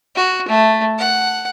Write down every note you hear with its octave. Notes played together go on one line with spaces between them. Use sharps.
F#4
A3
F#5